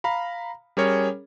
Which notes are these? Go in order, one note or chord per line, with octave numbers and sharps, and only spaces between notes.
F5 A#5 B5
G3 C#4 G#4 A#4 C#5